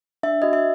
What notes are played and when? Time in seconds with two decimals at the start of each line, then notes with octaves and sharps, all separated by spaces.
0.23 D4 E5
0.42 F#4 D#5
0.53 E5